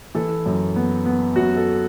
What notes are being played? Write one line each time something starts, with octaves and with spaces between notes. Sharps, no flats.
E3 A4
F#2
B3
B3
F#2 F#4
A4